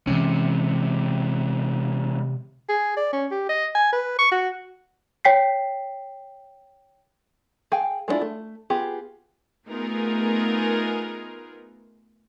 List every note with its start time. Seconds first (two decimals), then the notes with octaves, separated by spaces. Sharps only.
0.07 C3 E3 G#3 C#4
2.69 G#4
2.97 D5
3.13 C#4
3.31 G4
3.49 D#5
3.75 G#5
3.93 B4
4.19 C#6
4.31 F#4
5.25 C#5 G5 B6 C7
7.72 G#4 F5 G5 G#5
8.08 G#3 B3 D4 E4 F4
8.21 A3
8.70 B3 F4 G4 G#4
9.68 A3 B3 D#4 F4 G#4 A#4